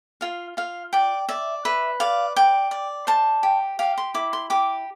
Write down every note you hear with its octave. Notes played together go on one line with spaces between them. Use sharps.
F4 F5
F4 F5
D5 G5
D5 E5
B4 E5
D5 F5
D5 G5
D5
C5 A5
G4
G4 F5
C6
E4 D6
C6
G4 D6